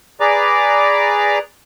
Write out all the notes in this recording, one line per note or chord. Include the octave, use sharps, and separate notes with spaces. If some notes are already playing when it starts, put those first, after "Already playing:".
G#4 B4 D5 A#5 D6